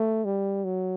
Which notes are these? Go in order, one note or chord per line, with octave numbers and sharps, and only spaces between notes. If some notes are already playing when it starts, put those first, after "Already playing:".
Already playing: A3
G3
F#3